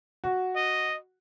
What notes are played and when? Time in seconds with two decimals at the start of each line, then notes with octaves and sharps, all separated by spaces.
0.24 F#4
0.56 D#5